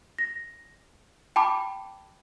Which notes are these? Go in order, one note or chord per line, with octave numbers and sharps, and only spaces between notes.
A#6
G5 A5 B5 D6